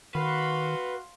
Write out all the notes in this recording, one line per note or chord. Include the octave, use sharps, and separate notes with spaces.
D#3 F#4 B4 F5 C6